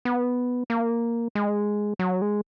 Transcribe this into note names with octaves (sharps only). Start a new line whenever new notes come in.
B3
A#3
G#3
F#3
G#3